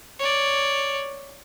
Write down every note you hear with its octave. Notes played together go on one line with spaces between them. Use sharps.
C#5 D5